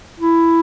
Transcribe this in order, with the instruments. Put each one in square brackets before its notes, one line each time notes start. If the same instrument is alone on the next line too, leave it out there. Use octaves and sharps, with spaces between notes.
[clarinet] E4